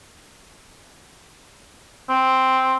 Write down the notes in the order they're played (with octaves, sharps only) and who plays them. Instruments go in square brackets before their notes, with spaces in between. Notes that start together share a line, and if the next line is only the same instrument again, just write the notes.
[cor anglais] C4